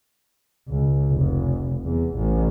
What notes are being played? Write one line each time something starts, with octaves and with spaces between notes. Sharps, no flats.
C#2
F1
E2
A1